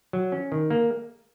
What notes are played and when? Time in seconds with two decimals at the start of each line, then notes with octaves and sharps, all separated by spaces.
0.13 F#3
0.32 C#4
0.52 D#3
0.70 A#3